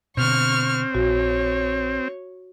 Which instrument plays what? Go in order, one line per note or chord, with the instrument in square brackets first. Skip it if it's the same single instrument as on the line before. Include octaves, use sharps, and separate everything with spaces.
[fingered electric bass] B2 D3 [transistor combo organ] C4 [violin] C#6 F6
[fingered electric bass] A#1 [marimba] F#4 [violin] C#5